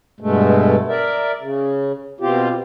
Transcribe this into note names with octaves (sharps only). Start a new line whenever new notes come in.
G2 B2 G#3 A3
A#4 D5 E5
C#3
B2 C4 F4 G4